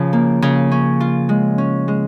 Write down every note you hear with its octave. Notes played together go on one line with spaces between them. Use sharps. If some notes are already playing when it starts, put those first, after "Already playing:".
Already playing: C#3 F3
A#3
C#3
C#4
F4
G#3
C#4
G#3